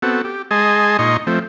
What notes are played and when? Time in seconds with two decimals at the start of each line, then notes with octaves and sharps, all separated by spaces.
0.02 B3 C4 F#4 A4
0.24 G4
0.51 G#3 G#4 D#5 G#5 A5 C6
0.99 A#2 D#4 D#5 C6 C#6
1.27 F3 A3 C4